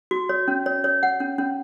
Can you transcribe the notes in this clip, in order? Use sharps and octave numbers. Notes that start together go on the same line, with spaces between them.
F#4
C#5
C#4
C#5
C#5
F#5
C#4
C#4